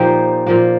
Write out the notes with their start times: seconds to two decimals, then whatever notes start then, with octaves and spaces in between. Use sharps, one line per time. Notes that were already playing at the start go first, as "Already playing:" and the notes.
Already playing: A#2 F3 A#3 D#4 F4 G4 C5
0.46 A#2 F3 A#3